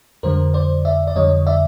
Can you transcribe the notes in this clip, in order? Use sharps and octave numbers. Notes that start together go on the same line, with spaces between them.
F2 D3 G3 A#4 C5
C5 D5
D5 E5
D5
F2 D3 G3 C#5 D#5
D5 E5